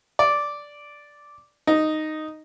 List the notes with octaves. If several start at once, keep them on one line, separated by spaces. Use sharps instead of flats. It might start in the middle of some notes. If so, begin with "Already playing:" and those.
D5
D#4